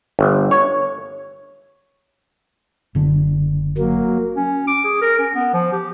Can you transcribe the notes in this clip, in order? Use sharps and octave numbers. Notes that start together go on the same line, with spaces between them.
G1
C#5
F#1 D3
F#3 A#3
C#4
D6
G#4
A#4
C#4
B3
F3
G4